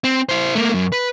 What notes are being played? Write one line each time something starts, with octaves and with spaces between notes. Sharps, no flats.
C4
E4 C5
A3 A#3
F#2
B4